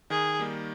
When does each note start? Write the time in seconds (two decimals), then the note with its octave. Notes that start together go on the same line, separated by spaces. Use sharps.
0.10 D#3 G#4
0.39 G3 A#3 D#4